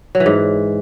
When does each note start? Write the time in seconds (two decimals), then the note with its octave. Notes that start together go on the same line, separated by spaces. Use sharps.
0.15 F#3
0.20 E3
0.26 G#2